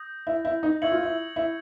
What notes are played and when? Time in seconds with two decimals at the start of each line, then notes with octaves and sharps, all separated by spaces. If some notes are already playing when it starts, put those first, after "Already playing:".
Already playing: D#6 G6 A#6
0.27 E4
0.45 E4
0.63 D#4
0.82 E4 C#6 E6 G#6 C#7 F#7
0.92 F4
1.03 E4
1.36 E4